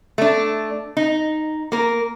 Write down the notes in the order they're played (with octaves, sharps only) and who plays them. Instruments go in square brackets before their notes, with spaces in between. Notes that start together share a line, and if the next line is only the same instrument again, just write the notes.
[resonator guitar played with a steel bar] A3 D4
D#4
A#3 A#4